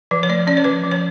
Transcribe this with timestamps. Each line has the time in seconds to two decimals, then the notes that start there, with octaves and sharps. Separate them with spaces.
0.11 F3 B4
0.23 C#5
0.29 A3 D5
0.47 C#4 D5
0.57 C#5
0.64 F3 B4
0.84 F3
0.91 C#5